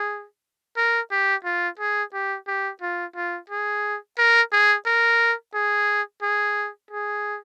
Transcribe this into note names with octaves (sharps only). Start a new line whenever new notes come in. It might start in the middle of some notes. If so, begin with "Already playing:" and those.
Already playing: G#4
A#4
G4
F4
G#4
G4
G4
F4
F4
G#4
A#4
G#4
A#4
G#4
G#4
G#4